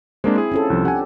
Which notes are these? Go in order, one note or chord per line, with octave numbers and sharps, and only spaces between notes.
G#3 A#3 C4 D4 C5
E4 G#4
C#4 F4 A4
C2 F3
D4 G4 F#5 G#5